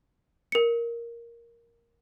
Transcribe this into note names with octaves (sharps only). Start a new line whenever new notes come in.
A#4 C#7